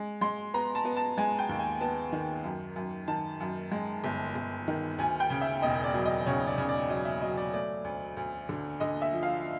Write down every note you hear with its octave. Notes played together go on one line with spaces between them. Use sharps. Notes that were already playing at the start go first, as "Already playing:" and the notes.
Already playing: G#3
G#3 C6
B3 A#5
A5
B3
A5
G#3 G#5
G5
D#2
G#5
B3 A5
D#3
F#2
F#2
D#3 A5
F#2
G#3
G1
G1
D#3
D2 G#5
G5
C#3
E5
E1 D#5
D5
F#3
D#5
C#3 C#5
D5
C#3
D5
F#3 D#5
E5
F#3 D#5
D5
A3 D5
D2
D2
D3
D3 D#5
E5
F3
F5